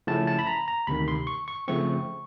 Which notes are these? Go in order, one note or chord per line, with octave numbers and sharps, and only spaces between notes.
C#3 F3 A3 C#4 E4 A5
A5
B5
A#5
A#5
D2 C3 D#3 B5
C6
C#6
C#6
C#3 F3 A3 C4 C#6